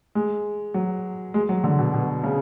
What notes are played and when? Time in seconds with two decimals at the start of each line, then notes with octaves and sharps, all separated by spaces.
0.15 G#3
0.74 F#3
1.34 G#3
1.49 F#3
1.64 D3
1.79 B2
1.94 B2
2.24 C#3